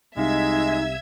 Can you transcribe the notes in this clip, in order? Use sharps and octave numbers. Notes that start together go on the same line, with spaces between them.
C2 C3 G#3 D#4 E5 F5 E6 G#6